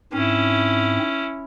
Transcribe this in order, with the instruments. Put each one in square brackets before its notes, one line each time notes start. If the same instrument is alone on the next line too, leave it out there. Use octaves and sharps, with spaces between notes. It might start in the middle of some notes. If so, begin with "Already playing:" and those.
[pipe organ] G#2 C4 [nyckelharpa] C#4 E4